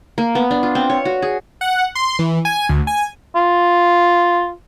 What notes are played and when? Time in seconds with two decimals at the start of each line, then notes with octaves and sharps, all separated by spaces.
0.18 A#3
0.35 B3
0.51 D4
0.63 F4
0.75 C4
0.90 C#5
1.05 F#4
1.22 G#4
1.61 F#5
1.95 C6
2.19 E3
2.45 G#5
2.69 D2
2.87 G#5
3.35 F4